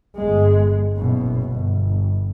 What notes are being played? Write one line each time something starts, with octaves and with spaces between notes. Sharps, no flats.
G1 G#3
F#1 B2
G1